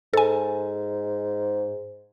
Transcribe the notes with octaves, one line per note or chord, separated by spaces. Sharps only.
G#2 A4 G#5